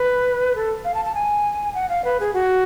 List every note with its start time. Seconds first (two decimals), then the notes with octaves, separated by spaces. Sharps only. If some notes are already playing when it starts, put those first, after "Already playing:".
Already playing: B4
0.55 A4
0.85 F5
0.94 A5
1.05 A5
1.15 G#5
1.75 F#5
1.89 F5
2.05 B4
2.20 G#4
2.34 F#4